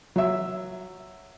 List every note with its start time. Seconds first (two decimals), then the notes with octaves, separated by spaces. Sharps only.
0.16 F#3 E5